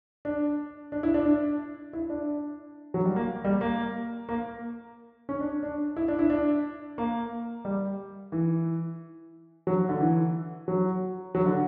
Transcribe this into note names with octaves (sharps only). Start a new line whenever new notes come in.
D4
D4
E4
D4
D4
E4
D4
F#3
G3
A#3
G3
A#3
A#3
C#4
D4
D4
E4
D4
E4
D4
A#3
G3
E3
F#3
D3
E3
F#3
F#3
D3